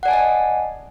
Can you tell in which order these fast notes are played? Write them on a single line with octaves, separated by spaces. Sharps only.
F#5 D5 G#5 A5 D#5